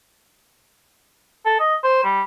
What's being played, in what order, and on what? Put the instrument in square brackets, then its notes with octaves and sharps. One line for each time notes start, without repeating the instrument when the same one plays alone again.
[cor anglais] A4
D#5
C5
G3